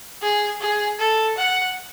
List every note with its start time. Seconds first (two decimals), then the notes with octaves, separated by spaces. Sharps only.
0.22 G#4
0.61 G#4
0.99 A4
1.37 F#5